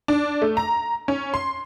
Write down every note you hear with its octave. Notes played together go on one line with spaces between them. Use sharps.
D4
A3
A#5
C#4
C6